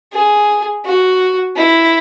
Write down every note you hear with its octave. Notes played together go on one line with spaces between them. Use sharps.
G#4
F#4
E4